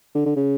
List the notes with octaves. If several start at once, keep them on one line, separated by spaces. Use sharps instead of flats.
D3
D3
C#3